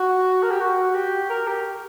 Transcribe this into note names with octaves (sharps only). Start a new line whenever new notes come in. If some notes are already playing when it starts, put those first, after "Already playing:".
Already playing: F#4
A#4
G4
F#4
G4
A#4
G4